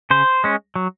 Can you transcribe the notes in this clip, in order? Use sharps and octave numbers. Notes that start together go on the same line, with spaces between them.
C#3 C5
G#3 C#4
F#3